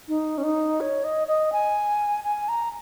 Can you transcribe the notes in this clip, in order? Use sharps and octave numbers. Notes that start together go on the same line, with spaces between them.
D#4
C#4
D#4
C#5
D#5
D#5
G#5
G#5
A#5